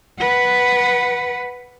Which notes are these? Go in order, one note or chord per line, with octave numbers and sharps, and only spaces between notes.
B4 F#5